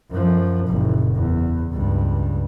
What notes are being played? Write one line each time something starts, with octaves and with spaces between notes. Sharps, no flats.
F#2 F3
F#1 A#2
E2
C#2 G2